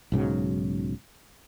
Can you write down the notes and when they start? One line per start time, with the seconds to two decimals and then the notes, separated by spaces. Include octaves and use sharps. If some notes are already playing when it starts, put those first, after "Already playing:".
0.12 B1 G#2 C#3 F#3